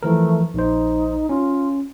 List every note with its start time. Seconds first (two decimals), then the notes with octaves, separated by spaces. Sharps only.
0.03 E3 F3 A3 A#4
0.54 A#1 D#4 C5
1.29 C#4 F4